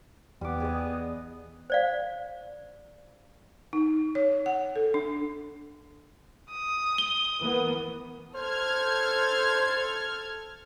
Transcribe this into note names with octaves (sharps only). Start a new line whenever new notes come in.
E2 G3 B3 D6
G#4 D5 D#5
C5 D5 F5
D#4
C#5
F#5
A4
D4
D#6
G7
E3 A#3 B3
A4 C5 F6 G#6